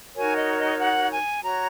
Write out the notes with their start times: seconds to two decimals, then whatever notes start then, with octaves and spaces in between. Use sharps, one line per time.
0.15 D#4 F#4 A#4 C#5 G#5
0.36 D#5
0.58 D#5
0.79 F#5
1.11 G#5
1.43 F#4 C#5 A#5